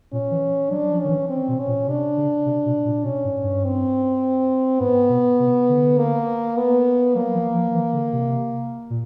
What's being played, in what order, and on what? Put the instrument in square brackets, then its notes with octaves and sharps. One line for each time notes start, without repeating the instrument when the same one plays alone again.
[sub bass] A#2 [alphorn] C#4
[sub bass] E3
[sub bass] F#3 [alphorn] D4
[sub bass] F3
[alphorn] C#4
[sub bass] D#3
E3
[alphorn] C4
[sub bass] B2
[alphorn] C#4
[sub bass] A#2
[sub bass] C3 [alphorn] D4
[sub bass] C#3
C3
B2
A#2
[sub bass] B2 [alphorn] C#4
[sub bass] G#2
G2
[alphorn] C4
[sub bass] G#2 [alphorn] B3
[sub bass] B2
C3
D3
[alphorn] A#3
B3
[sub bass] F#3 [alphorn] A#3
[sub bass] F3
F3
E3
D3
C3
A#2